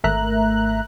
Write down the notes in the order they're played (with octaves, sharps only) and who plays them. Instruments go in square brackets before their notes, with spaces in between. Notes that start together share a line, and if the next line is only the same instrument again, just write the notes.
[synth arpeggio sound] G#1 A3 A#4 E5 A#5 F#6